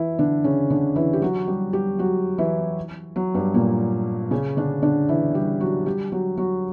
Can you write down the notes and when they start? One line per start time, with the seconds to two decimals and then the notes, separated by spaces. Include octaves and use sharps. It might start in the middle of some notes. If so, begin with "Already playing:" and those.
Already playing: E3 E4
0.19 D3 D4
0.44 C#3 C#4
0.70 D3 D4
0.96 E3 E4
1.13 G4
1.22 F#3 F#4
1.48 G3 G4
1.73 G3 G4
1.99 F#3 F#4
2.38 E3 E4
3.16 F#3
3.34 G2 G3
3.54 A#2 A#3
4.31 C#3 C#4
4.57 D3 D4
4.82 D3 D4
5.09 E3 E4
5.34 G3 G4
5.60 F#3 F#4
5.86 G3 G4
6.12 F#3 F#4
6.37 F#3 F#4